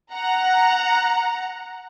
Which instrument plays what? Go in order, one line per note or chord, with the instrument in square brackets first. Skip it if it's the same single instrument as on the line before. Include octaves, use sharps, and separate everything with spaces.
[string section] F#5 A#5